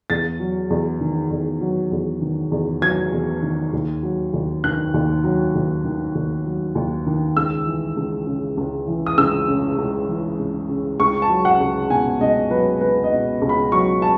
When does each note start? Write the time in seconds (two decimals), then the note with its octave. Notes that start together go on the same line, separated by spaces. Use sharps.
0.10 E2 A6
0.40 F#3
0.70 E2
1.01 D#3
1.31 E2
1.61 F#3
1.92 E2
2.22 D#3
2.52 E2
2.82 F#3 G#6
3.13 E2
3.43 D#3
3.73 D#2
4.03 F#3
4.34 D#2
4.64 D#3 F#6
4.94 D#2
5.24 F#3
5.55 D#2
5.85 D#3
6.15 D#2
6.46 F#3
6.75 D#2
7.06 D#3
7.37 C#2 E6
7.66 E3
7.97 C#2
8.27 C#3
8.57 C#2
8.88 E3
9.06 D#6
9.18 C#2 E6
9.48 C#3
9.78 C#2
10.08 E3
10.39 C#2
10.69 C#3
11.00 C#2 C#6
11.22 A5
11.29 F#3
11.45 F#5
11.60 C#2
11.90 B2 G#5
12.21 C#2 D#5
12.51 F#3 B4
12.81 C#2 B4
13.04 D#5
13.12 B2
13.42 C#2
13.49 B5
13.72 F#3 C#6
14.02 A5